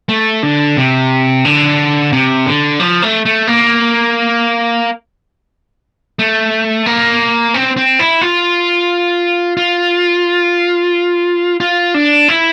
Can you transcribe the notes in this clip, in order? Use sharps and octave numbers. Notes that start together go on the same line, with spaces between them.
A3
D3
C3
D3
C3
D3
F3
A3
A3
A#3
A3
A#3
C4
C4
E4
F4
F4
F4
D4
E4